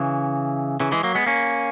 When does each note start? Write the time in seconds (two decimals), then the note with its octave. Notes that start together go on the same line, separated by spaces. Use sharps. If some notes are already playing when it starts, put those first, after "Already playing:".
Already playing: C#3 E3
0.80 C#3 E3
0.92 E3 G#3
1.03 F#3 A#3
1.15 G#3 B3
1.26 A#3 C#4